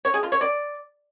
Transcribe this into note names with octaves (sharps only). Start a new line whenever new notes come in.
C#5
G#4
F4
C#5
D5